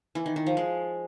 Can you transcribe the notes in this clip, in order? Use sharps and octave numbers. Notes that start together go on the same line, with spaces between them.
E3
D#3
D#3
F3
G#3